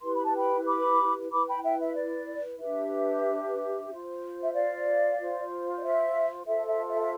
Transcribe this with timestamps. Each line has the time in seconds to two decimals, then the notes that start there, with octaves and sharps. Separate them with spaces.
0.02 E4 G4 B4 C6
0.14 B5
0.25 A5
0.36 G5 B5
0.66 B5 D6
1.31 E4 B4 B5 D6
1.47 G5 B5
1.63 E5 G5
1.80 E5
1.95 D5
2.59 D4 G4 B4 E5
3.88 F4 C5
4.43 E5
4.53 D5 F5
5.18 F4 C5
5.78 D5
5.82 E5
6.46 F4 A4 C5 E5
6.67 E5
6.89 E5
7.00 E5